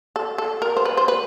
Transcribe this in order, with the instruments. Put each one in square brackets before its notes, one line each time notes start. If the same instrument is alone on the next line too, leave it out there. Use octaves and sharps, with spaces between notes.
[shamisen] A4
A4
A#4
C5
B4
C5
B4